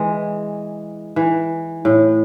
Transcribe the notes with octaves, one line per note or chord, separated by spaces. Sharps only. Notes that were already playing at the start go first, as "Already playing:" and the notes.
Already playing: E3 G#3
E3
A2